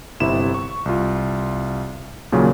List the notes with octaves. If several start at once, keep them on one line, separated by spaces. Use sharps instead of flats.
G1 C3 E4 E7
C#6
C2 F4
D#2 A#2 C#3 F#3